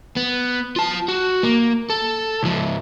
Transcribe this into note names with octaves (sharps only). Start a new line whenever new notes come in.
B3
F4 A5
F#4
A#3
A4
C#2 F3